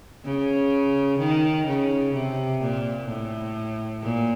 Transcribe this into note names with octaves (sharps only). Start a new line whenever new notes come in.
C#3
D#3
C#3
C3
A#2
A2
A#2